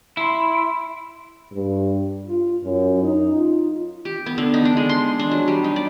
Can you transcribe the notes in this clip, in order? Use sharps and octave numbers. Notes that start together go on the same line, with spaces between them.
E4 B5 C6 B6
G2
F4
F#2
D#4
F4
G4
B3
D3
D#4
D4
G#3
C6
D4
F#3
G3
D#4
D5